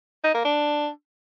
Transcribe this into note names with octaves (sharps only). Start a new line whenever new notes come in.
D#4
A#3
D4